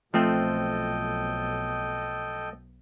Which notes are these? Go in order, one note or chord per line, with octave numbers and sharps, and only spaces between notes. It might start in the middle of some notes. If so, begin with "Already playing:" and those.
B1 F3 A3 C4 A4 D#5 G5